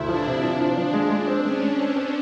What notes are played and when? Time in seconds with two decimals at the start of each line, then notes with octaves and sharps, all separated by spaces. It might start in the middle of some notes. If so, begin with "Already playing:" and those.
Already playing: D2 E4
0.08 F3 D4
0.27 C3
0.43 F3 D4
0.60 F3
0.77 F3
0.93 G#3
1.10 G#3
1.28 C4
1.44 G#3 C#4
1.62 G#3
1.78 C4
1.96 C4